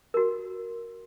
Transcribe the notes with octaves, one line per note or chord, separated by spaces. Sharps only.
F#4 A#4